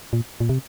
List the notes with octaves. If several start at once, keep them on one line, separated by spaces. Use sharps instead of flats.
A#2
A#2
C3